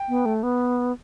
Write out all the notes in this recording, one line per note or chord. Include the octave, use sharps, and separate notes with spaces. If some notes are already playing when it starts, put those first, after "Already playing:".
Already playing: G5
B3
A3
B3